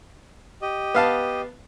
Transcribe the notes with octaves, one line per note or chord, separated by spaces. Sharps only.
G4 D#5
B3 F5 A5